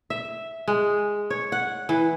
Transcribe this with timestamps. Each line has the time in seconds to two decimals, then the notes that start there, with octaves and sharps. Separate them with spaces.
0.10 E5
0.68 G#3
1.30 C#5
1.52 F#5
1.89 E3